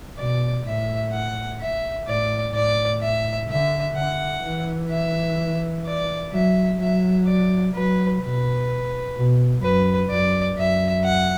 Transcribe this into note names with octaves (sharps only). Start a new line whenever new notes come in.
B2 D5
A2 E5
F#5
E5
A2 D5
A2 D5
E5
D3 E5
D3 F#5
E3
E5
D5
F#3 E5
F#3 E5
D5
F#3 B4
B2 B4
B2
F#2 B4
F#2 D5
F#2 E5
F#5